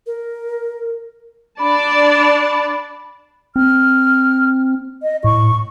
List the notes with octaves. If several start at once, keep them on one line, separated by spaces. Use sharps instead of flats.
A#4
D4 D5 A5 B5
C4 F6
D#5
A2 C#6